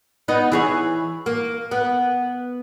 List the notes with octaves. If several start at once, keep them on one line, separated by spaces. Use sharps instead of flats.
B3 D#4 D#5
E3 G#4 C#5
A#3
B3